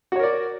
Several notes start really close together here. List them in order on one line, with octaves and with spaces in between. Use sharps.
F#4 C#5 A#4 D5